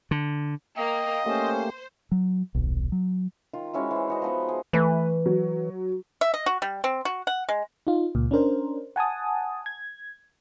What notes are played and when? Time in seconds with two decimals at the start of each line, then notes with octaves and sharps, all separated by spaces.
0.11 D3
0.78 A#3 D#5 G5
1.26 A3 A#3 C#4 G4 C5
2.12 F#3
2.55 D#1 B1
2.92 F#3
3.53 D#3 F4
3.74 G#3 C#4 E4 F#4
3.91 E3 C5
4.08 D#4 F#4 D#5
4.22 F3 B3 D#4
4.49 G#4
4.73 E3 A3 B4
5.26 F#3
6.21 E5
6.34 D#5
6.46 F#4
6.62 G3
6.84 C4
7.05 F#4
7.27 F#5
7.49 G#3
7.87 D#4 F4
8.15 C#2 A#2
8.31 C#4 D4 A#4 C5
8.96 F#5 G#5 A5 D#6
9.66 G#6